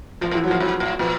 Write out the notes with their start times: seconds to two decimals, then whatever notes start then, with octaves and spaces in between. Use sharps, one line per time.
0.21 A2 F3
0.31 A2
0.35 E3
0.44 F#3
0.48 A2 F3
0.60 G#2 F#3
0.80 A2
0.99 A#2 F3